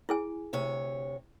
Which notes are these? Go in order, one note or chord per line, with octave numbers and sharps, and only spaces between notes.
E4 G#4 G#5
D2 C3 C#5